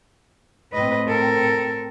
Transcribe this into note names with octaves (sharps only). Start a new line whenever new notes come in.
A2 C4 B4 D#5
A4 A#4